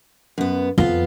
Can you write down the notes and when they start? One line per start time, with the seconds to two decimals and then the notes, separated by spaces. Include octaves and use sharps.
0.38 F#2 B3
0.78 F2 B3 F4